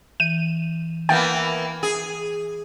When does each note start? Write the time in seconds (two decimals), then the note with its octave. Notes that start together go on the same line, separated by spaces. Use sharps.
0.20 E3 D#7
1.09 E3 A#3 B3 G5 A6
1.83 G#4